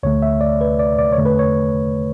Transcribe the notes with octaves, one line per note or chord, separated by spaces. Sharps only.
D2 D3 A3 C#5
E5
D5
B4
D5
D5
C#5
E2 D3 A3
B4
C#5